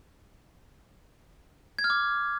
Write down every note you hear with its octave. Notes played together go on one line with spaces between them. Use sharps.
G#6
F6
D6